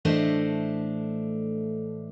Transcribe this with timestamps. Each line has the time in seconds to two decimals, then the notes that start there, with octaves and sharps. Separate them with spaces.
0.05 A2 E3 A3 D4 C5 D#5